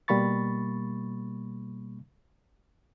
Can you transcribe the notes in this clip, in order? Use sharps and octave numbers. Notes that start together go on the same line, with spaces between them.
B2 G3 A#3 B5 C#6 A6